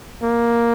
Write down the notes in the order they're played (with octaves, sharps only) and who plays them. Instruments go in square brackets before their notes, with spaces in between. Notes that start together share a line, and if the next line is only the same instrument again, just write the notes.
[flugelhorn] A#3